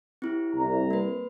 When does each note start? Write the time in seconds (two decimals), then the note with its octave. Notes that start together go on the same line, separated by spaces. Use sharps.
0.22 C4 E4 G4
0.53 C2 A#5
0.91 A#3 B4